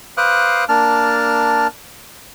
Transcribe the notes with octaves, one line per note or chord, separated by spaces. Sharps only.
B4 C5 F5 D6 D#6 F#6
A#3 D4 A5 F6